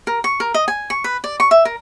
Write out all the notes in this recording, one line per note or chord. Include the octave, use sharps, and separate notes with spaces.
A#4
C#6
A#4
D#5
G#5
C#6
B4
D5
C#6
E5
A#4